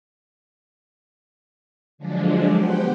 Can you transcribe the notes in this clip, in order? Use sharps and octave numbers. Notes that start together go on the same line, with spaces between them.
D3 F3 F#3 G#3 D4
B3 G4 C5 F#5 G5